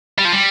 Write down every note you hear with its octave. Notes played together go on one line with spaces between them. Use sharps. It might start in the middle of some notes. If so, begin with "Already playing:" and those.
G3
F3
G3